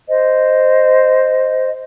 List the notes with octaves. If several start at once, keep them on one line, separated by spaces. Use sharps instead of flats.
C5 D#5